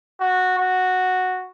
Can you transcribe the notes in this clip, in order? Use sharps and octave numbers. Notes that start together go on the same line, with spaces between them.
F#4
F#4